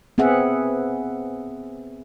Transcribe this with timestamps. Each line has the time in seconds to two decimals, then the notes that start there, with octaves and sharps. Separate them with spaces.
0.18 B3 C4 G#4 E5 F#5